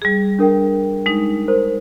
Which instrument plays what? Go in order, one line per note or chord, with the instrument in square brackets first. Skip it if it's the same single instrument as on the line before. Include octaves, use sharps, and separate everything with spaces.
[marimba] G3 G#4
[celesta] D4 A#4 G5
[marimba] G#3 D#4
[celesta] A#4 C5